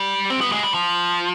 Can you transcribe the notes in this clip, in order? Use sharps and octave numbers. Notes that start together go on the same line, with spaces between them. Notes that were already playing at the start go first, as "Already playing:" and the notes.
Already playing: G3
C4
B3
G#3
G3
F3